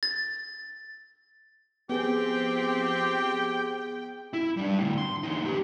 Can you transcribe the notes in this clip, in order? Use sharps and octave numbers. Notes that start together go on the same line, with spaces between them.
A6
F3 B3 C4 G4 G#4 G5
E4
G3 D4
A2 D3
C6
E2 D#4
G4 B4